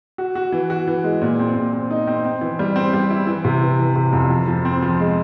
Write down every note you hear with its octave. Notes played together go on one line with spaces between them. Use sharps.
F#4
F#4
E3
F#4
E3
G#3
A#2
C4
A#2
C4
D#4
C4
C4
E3
G3
C4
G3
E4
E3
C3
E3
E3
C3
F2
F3
F3
C4
F3
G#3